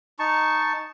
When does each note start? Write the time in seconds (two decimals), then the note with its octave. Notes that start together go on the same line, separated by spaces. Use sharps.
0.19 D#4 A5 C#6